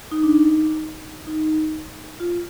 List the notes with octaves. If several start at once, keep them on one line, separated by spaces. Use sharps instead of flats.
D#4
D4
D#4
D#4
F4